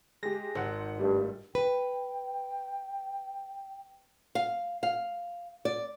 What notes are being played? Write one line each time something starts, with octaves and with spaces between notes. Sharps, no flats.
G#3 G4 A#6
G#1 C5 F#5
G2 G3 A3
B4 G5
F5
F5
D5